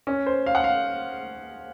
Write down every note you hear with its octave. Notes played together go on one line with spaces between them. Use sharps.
C#4
C5
F5
F#5
F5